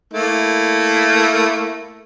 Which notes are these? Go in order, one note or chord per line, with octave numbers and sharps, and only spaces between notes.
A3 A#3 E4